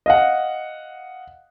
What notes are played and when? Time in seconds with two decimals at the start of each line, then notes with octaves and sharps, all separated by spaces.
0.06 D#5 F5 F#5